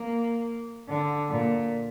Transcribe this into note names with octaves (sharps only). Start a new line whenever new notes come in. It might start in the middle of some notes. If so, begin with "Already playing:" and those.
Already playing: A#3
D3
A#2